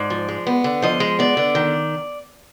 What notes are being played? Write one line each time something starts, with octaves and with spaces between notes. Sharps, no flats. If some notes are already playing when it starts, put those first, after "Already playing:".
Already playing: G#2 D5
F3
G#3
B3
D3
F3 D#5
G#3
B3 D5
D3
D#3